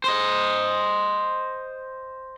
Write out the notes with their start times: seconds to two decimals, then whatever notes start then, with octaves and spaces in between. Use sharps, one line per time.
0.04 C5 D#5